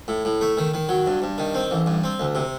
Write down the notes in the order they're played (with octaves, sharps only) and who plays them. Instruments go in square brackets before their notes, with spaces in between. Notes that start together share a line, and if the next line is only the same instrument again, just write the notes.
[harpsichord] A2
A2
A3
D#3
D#3
F#3
G2
G2
D#3
C4
A1
G2
C4
D2
C3